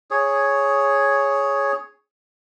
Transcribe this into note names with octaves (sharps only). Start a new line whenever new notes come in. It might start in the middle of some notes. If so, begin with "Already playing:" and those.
G#4 C#5